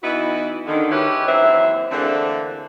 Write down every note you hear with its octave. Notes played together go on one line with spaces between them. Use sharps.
E3 B3 D#4 E4 F#4
D3 D#3
G#3 C#4 E4 G4 B4 C#5
D#2 E3 F#3 C4 E5
D3 E3 A3 A#3 C4 G#4